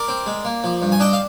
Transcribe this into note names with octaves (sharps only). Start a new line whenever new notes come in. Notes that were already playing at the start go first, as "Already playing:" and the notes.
Already playing: A#4 D5
C4
G#3
A#3
F3
G2
G#5
D4 D#5 G5
F5